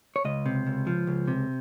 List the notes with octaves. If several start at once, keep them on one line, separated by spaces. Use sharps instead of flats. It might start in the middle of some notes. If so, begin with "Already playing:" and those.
C#5
C#2 D#5
C3
C#2
F3
C#2
C3